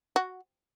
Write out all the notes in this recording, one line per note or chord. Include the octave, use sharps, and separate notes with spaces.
F#4